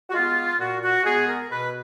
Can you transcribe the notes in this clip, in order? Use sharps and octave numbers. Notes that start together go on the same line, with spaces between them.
F#4
G#3 B3 F4
A#2 F#4
F#4
G#3 B3 G#4
A#4
B2 B4